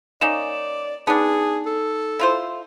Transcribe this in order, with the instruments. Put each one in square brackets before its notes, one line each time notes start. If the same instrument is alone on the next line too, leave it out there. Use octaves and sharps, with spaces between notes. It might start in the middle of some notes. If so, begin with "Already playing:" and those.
[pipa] A#3 C#4 D#4 [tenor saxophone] D5 [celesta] E7
[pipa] B3 D4 [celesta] D#4 A5 [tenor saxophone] G#4
[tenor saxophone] A4
[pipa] E4 F4 C5